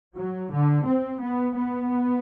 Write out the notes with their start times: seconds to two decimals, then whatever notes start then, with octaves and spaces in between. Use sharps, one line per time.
0.16 F#3
0.52 D3
0.87 C4
1.21 B3
1.56 B3